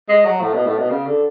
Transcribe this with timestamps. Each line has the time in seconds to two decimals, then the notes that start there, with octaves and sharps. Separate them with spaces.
0.09 G#3
0.25 F#3
0.41 A2
0.54 B2
0.66 A2
0.78 B2
0.90 C#3
1.06 D3